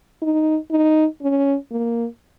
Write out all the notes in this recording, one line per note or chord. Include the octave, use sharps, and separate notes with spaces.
D#4
D#4
C#4
A#3